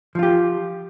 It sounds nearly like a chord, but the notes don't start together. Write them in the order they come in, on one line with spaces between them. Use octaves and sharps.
F3 F4 G4